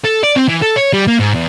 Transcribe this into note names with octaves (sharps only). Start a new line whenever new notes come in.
A4
D5
C4
E3
A4
C#5
G3
A#3
G#2
E2